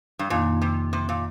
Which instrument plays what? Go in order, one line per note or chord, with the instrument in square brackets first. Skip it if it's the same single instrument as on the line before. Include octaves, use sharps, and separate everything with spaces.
[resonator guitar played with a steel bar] G2
[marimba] F2 D#3 A#3 D#4 [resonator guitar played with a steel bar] A#2
[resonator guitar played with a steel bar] C3
C3
A#2